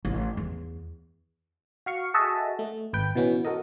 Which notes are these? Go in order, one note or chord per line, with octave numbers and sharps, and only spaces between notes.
A1
E2
F#4 F5 C#6
F#4 G#4 A4 D#5 E5 A5
A3
G#1 B4 G5
B2 E3 B3 C#4
F#4 A4 A#4 D#5